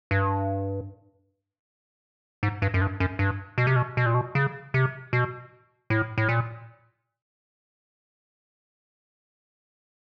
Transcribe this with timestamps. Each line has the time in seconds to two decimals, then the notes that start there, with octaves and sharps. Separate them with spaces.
0.11 G2
2.43 G#2
2.62 G2
2.74 F#2
2.81 G2
3.00 F#2
3.19 G2
3.58 B2
3.67 C3
3.76 B2
3.97 B2
4.06 A#2
4.14 B2
4.35 C#3
4.74 C3
5.13 B2
5.90 A2
6.18 A2
6.29 A#2